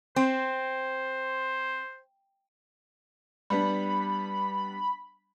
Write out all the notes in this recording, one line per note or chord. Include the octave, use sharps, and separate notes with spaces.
C4 C5
G3 B3 D4 B5